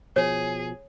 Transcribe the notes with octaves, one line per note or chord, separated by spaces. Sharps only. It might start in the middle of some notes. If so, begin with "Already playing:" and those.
B2 F3 G#4 C#5